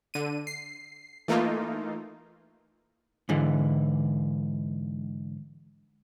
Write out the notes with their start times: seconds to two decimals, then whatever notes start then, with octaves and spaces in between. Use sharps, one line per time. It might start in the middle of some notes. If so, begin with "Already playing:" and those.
0.14 D3 D#7
0.47 C7
1.28 E3 A3 A#3 D#4 F4
3.29 G#2 D3 E3